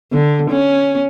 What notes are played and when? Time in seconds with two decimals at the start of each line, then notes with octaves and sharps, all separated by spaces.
0.12 D3
0.51 C#4